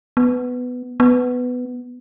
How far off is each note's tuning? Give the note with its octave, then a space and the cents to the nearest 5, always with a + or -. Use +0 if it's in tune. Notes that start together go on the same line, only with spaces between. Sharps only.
B3 +10
B3 +10